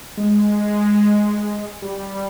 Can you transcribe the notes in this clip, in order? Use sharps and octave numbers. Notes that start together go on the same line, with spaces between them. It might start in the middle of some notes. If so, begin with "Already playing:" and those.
G#3
G3